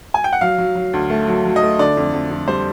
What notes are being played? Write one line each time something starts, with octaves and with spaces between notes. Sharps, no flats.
G#5
G5
F#5
F#3 F5
F#3
F#3
D2
A3
F#3
F#3
D#5
A3
D3 D5
F2
F2
F2
G3 C5